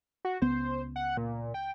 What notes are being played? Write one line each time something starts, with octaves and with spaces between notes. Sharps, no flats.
F#4
C#2 B3 C5
F#5
A#2
G5